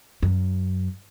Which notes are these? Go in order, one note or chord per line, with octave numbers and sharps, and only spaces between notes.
F#2